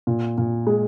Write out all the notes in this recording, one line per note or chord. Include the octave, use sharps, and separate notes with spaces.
A#2
A#2
G#3